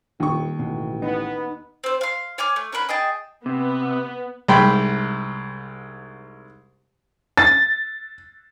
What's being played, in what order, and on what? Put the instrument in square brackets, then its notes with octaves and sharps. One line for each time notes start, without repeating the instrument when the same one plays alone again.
[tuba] D#1 [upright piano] D#2 C#6
[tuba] A1 [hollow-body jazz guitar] B2
[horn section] B3 [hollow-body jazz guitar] D#4
[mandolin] C4 C5
F5 C6
C#5 G#5 D6 F6
A3
C#4 A#4 F#5 B5
G#4 D#5 G5 A5
[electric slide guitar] C3 [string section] B3
[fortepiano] C2 G#2 G5 B5 C6
[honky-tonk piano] A6